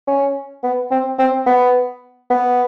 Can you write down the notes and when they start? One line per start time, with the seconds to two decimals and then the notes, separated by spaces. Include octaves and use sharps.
0.08 C#4
0.64 B3
0.91 C4
1.19 C4
1.46 B3
2.30 B3